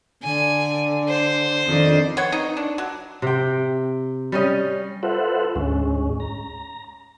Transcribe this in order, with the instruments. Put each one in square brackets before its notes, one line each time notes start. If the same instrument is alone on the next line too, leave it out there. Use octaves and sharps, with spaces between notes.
[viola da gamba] D3 [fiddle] G#5
[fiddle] C5
[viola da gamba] F2 D#3 D4
[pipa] B3 C#5
D#4
D4
F#3
[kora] C3 G5
G3 C#4 D#5
[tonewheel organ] F4 A4 B4 C5 E5 F#5
D2 G#2 G#3 C#4
A#5